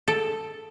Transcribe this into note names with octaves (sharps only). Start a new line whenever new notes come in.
A4